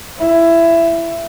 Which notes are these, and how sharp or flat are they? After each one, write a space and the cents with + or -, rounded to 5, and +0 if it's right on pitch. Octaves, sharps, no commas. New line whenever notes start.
E4 +15